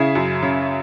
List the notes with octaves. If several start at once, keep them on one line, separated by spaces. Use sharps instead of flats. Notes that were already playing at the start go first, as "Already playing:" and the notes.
Already playing: C#3 E4 G#4
F#2
C#3